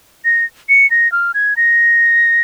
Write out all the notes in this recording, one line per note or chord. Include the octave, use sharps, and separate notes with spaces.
A#6
C#7
A#6
F6
G#6
A#6